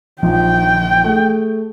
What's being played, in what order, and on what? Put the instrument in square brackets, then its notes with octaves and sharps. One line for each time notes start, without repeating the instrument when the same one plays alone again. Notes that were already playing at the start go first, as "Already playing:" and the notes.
[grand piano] A#1 F3 D#4 [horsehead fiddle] G5
[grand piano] A3 G#4